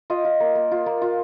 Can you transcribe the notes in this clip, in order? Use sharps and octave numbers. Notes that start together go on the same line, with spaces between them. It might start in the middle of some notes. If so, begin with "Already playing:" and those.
F4 D#5
F4
A#3
A#3
F4
A#3
F4